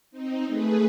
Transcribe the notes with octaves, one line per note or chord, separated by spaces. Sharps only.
C4 D#4
A3 G#4 B4